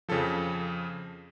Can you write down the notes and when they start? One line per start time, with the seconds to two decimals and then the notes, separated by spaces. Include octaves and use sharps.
0.09 F2 C#3 F3 A4